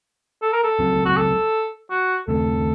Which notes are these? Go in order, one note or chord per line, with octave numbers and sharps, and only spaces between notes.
A4
A#4
A4
C#2 C#3 F#3 C4
F#4
A4
F#4
D#2 C#3 A3 C4 A4